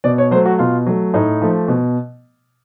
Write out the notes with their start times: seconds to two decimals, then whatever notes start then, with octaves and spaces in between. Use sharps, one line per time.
0.04 B2 D5
0.18 C#5
0.31 F#3 C5
0.35 A3
0.45 F#4
0.59 B2 F4
0.87 F#3 A3
1.14 A2 D#4
1.42 F3 A3
1.68 B2